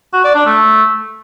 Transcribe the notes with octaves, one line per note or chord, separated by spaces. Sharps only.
F#4
D5
D4
A3